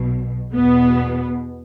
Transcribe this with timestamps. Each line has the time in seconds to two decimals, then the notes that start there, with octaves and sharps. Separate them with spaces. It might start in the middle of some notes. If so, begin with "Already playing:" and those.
Already playing: B1 B2
0.54 E2 B2 B3